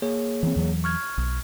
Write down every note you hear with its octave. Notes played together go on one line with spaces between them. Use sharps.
A#3 G#4 C#5
E3 C4
E2 E3 F#3
C#6 F6 G#6
B1